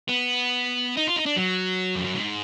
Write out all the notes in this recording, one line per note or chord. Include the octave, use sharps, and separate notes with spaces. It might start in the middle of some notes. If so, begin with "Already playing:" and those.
B3
D#4
F4
D#4
D4
F#3
F2
F#2
G#2